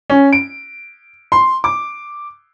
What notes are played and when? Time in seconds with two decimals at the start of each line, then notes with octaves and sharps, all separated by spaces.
0.10 C#4
0.33 D7
1.32 C6
1.64 D6